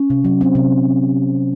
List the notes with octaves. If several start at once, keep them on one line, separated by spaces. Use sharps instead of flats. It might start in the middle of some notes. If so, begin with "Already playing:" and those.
Already playing: C#4
C3
F#3
C4
C3